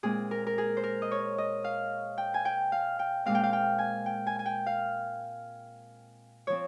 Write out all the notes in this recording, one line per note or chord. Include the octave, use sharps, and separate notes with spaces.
A#2 G#3 C4 G#4
A#4
A#4
G#4
C5
A#4
D#5
C#5
D#5
F5
G5
G#5
G5
F5
G5
A#2 G#3 C4 F5
G5
F5
G5
G#5
G5
G#5
G#5
G5
F5
F3 C4 C#5